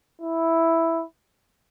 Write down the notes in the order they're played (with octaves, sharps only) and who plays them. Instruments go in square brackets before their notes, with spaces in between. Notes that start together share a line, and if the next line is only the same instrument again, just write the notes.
[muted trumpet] E4